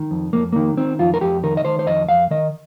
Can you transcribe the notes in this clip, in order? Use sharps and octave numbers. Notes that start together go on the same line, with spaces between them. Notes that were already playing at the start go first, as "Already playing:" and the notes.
Already playing: D#3
F2
F2 A#3
D#3 A#3
D#3 C4
F2 F4
A#4
F2 G4
D#3 A#4
D#5
D#3 C5
C5
F2 D#5
F2 F5
D#3 D#5